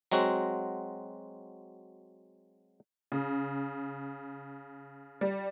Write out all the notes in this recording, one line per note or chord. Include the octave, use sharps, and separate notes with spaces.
F#3 G#3 C4 F#4
C#3
G3